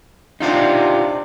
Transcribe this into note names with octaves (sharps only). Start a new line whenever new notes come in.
C3 D4 D#4 F4 G4